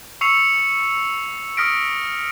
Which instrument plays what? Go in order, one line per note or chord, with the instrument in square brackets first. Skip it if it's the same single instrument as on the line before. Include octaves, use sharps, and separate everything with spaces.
[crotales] C#6 E6 C7 C#7 F7
D#6 F6 A#6 B6 D7